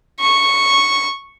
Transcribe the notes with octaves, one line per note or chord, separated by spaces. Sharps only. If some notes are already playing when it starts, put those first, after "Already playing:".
C#6